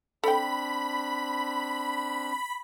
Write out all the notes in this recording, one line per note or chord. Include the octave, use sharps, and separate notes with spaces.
C4 D4 A4 G5 B5